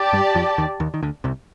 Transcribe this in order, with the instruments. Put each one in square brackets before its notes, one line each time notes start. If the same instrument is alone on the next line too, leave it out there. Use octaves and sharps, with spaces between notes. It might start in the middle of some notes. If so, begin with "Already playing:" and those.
Already playing: [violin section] G4 D5 A5
[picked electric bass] G2 G3
F2 F3
D#2 D#3
D#2 D#3
D#3
D2 D3
C2 C3